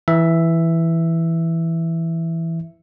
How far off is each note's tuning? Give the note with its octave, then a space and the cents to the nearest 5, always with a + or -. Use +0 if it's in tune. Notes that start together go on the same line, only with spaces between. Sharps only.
E3 +0 E5 +5